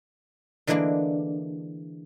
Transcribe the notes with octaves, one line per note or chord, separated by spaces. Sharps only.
D3 E3 G#3 A#3 D4